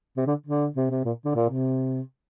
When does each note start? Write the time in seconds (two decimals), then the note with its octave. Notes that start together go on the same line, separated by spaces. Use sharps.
0.17 C3
0.27 D3
0.46 D3
0.76 C3
0.90 C3
1.05 A#2
1.25 D3
1.35 A#2
1.49 C3